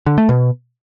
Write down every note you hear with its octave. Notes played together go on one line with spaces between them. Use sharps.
D3
A3
B2